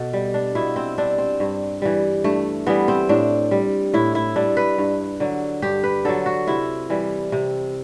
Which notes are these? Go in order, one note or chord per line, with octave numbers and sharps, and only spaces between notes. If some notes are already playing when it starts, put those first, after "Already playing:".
Already playing: B2 A4
G3
D4
B2 E4
C4
G3 D4
C4
G2
E3 G3
G2 A3
E3 G3 B3
C4
A2 D4
G3
A2 E4
E4
G3 D4
B4
G2
D3 F#3
G2 G4
B4
D3 F#3 A4
F#4
C3 E4
E3 G3
C3